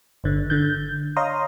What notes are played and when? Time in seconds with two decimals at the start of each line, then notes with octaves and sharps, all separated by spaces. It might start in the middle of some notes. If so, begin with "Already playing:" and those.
0.24 G1 D3
0.50 D3 G6
1.16 C#5 D#5 F5 A#5 C6 D#6